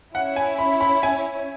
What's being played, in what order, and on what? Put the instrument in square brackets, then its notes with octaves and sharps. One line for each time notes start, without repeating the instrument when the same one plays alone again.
[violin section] C#4 E4 C#5 [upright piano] F#5
[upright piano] G#5
B5
B5
G#5